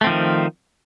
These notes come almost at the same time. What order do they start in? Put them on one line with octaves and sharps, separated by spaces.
A3 C4 F3 D#3